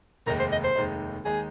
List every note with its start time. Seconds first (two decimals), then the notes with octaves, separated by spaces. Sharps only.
0.26 F1 D#2 D#3 G#3 D#4 A#4
0.39 C5
0.52 D#5
0.64 C5
0.76 F1 D#2 D#3 G#3 D#4
1.25 D#2 D#3 G#3 D#4 G#4